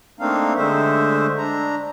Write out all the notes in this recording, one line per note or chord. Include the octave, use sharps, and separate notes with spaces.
A3 A#3 C4 D4 D#4 F5
D3 G#3 A3 C5 E5
D4 A#5